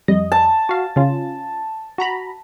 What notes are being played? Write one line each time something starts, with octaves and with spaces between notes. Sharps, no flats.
F2 G3 D#5
A5
F#4 F5
C#3 C#4 F4
F#4 A#5 B5